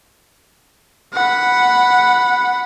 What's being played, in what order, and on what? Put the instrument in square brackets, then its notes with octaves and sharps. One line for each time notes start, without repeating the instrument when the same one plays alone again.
[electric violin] F#5 B5